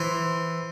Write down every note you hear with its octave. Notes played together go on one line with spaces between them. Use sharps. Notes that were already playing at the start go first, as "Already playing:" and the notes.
Already playing: E3 C5